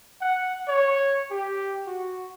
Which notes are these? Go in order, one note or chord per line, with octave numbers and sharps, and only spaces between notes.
F#5
C#5
G4
F#4